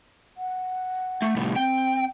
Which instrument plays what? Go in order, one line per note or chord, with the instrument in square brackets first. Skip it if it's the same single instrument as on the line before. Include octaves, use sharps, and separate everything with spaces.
[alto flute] F#5
[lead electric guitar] A3
C2 A2
[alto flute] C4 [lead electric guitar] G5